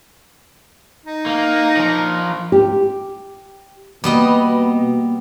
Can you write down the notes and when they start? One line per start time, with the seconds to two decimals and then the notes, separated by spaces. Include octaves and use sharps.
1.05 D#4
1.26 A#3
1.77 F3 A#4
2.52 G4
4.04 B2 G3 A#3 B3 D#5